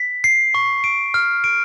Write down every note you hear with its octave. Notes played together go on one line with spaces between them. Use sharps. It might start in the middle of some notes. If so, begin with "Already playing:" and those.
Already playing: B6
C7
C#6
D7
F6
D7